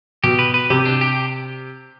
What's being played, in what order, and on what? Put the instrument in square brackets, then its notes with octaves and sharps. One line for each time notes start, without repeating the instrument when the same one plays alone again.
[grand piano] B2 [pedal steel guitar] G4
[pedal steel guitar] B4
B4
[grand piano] C3 [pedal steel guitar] G4
[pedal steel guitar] D4
G4